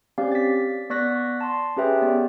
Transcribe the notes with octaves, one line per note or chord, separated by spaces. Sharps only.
C4 C#4 G4 D5 F5
A6 B6
B3 D5 C#6 F#6 A#6 B6
A5 C6
C#4 G4 G#4 B4 E5 G5
B3 D5